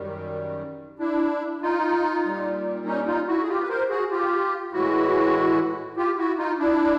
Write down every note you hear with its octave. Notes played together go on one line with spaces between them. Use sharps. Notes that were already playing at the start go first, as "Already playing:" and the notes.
Already playing: F#2 D#3 G3
D4 E4
D#4 F4
A#2 G3
C#4 D#4
D#4 F4
E4 F#4
G#4
F4 G4
B4
A#4 C5
F#4 G#4
F4 G4
A2 E3 G#3 E4 F#4
F4 G4
E4 F#4
D#4 F4
D4 E4